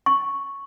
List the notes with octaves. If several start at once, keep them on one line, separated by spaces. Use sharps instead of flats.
C#6